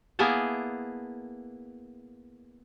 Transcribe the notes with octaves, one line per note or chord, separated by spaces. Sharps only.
A#3 B3 E4 G#4 G#5 A5